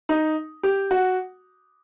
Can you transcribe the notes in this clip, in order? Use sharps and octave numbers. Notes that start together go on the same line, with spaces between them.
D#4
G4
F#4